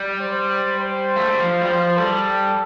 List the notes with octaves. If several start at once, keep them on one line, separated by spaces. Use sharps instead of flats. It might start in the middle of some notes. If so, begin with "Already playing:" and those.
Already playing: G3
C5
C5
A3
G3
F3
G3
F3
G3 A4